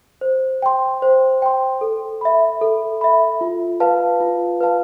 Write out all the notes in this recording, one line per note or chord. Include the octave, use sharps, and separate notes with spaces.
C5
G5 C6
C5
G5 C6
A4
E5 B5
A4
E5 B5
F4
B4 F5 A5
F4
B4 F5 A5